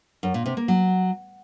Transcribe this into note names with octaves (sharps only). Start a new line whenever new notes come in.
F#2
A#2
C3
A#3
F#3